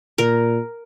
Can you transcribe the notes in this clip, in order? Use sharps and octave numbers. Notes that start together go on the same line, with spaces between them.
A#2 A#4